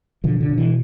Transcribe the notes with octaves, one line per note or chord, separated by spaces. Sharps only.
B2 D3 F3
D3
B2
E3